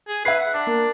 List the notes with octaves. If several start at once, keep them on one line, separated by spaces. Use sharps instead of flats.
G#4
B4 E5 C7
F#5
D4
A#3